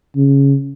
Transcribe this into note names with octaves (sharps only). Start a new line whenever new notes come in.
C#3